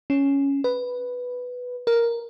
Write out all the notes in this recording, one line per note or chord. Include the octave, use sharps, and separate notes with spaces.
C#4
B4
A#4